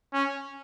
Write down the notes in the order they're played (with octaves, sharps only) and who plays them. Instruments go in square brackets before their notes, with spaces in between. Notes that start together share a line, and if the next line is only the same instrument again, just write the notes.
[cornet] C#4